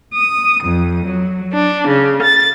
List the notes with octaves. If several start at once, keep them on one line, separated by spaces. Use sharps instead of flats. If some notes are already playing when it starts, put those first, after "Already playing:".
D#6
F2
F#3
D4
C#3
A6